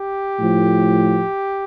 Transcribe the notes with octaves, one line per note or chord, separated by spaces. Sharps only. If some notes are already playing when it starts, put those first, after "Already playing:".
Already playing: G4
A2 F3